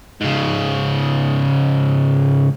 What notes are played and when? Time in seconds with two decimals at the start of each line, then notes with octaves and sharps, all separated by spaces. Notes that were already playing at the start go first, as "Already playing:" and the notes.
0.21 G#2 C#3